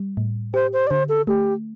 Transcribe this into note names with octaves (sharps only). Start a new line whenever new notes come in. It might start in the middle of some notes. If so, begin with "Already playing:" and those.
Already playing: G3
A2
G4 C5
C5
D5
D3 C5
A4
A3 G4